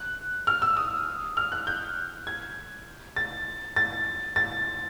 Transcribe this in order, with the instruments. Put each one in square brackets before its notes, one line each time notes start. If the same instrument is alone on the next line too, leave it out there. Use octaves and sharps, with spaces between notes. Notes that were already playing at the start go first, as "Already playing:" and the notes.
Already playing: [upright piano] F#6
F6
E6
D#6
F6
F#6
G6
G#6
A6
A6
A6